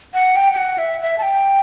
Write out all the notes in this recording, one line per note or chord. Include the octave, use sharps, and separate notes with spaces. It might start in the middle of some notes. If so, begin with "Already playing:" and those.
F#5
G5
G5
F#5
E5
E5
A5
G5